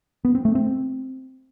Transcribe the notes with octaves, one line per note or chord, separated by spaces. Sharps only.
B3
C4
A3
C4